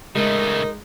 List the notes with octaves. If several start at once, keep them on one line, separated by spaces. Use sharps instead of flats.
C#3 G#3 A3 D#4 A#4